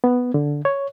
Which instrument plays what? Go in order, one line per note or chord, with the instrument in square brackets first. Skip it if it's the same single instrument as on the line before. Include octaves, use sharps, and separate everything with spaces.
[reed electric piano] B3
D3
C#5